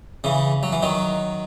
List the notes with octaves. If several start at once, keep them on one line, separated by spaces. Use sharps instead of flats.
C#3 E3
F#3
E3
D#3 F#3